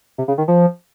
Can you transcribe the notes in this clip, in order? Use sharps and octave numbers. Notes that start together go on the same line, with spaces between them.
C3
C#3
D#3
F3